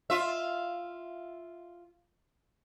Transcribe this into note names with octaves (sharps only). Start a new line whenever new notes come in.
F4 E5